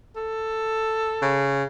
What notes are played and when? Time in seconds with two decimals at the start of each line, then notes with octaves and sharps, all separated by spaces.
0.16 A4
1.22 C#3